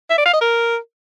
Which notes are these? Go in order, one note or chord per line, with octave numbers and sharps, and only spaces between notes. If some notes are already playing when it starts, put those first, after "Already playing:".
E5
D5
F5
D#5
A#4